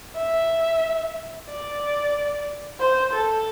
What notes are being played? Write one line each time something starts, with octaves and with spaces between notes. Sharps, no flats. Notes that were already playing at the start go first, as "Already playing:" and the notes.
E5
D5
C5
A4